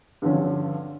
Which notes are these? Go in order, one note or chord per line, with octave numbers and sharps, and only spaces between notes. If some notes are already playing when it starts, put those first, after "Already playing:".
G2 D3 F3 C#4